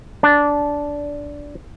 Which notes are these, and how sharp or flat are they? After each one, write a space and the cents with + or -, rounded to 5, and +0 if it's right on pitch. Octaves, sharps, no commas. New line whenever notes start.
D4 -10